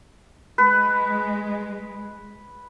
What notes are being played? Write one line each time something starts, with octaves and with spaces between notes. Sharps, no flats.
G#3 B4